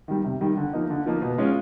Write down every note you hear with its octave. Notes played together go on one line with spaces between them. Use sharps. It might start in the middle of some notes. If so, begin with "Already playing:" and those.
D#3 G3
C3
D#3 G3
D3
F3 A#3 D#4
D3
F3 A#3 D#4
B2
G#3 C#4 F4